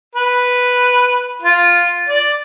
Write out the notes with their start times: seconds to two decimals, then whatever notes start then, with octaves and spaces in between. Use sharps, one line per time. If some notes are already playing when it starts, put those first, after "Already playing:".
0.15 B4
1.42 F4
2.09 D5